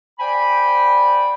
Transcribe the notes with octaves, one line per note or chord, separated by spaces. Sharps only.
C5 D5 G5 G#5 B5